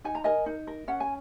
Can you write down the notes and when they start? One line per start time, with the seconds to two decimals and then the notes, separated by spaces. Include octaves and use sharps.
0.04 D#4 G#5
0.15 A#5
0.24 A#4 D#5 G#5
0.46 D#4
0.67 A#4
0.88 C#4 F#5
1.00 G#5